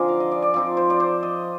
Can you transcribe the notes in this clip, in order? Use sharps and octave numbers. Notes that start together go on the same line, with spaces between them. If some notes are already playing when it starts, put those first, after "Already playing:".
Already playing: D3 F3 C4 D#4 G#4 A#4 D5
F5
D#5
D5
D5
F3 C4 D#4 D5
C5
D5
C5
D#5